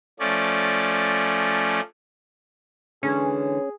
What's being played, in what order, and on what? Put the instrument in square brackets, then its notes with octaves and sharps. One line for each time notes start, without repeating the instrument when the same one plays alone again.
[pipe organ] F3 A3 C#4 D5
[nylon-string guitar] D3 E3 G#3 [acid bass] C#4 [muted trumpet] G#4